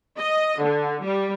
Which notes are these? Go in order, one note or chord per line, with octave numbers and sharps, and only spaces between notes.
D#5
D3
G3